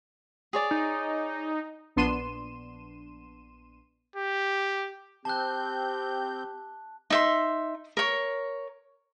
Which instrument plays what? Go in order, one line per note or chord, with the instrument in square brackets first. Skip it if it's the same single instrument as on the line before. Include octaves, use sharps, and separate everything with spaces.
[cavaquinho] G#4 C#5 D5
[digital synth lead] D#4
[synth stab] A#1 B3 D4 C6 D#7 E7
[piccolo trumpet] G4
[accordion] C4 G6 [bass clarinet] G4 [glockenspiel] A5 F#6
[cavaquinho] D#4 E5 C6
A#4 C#5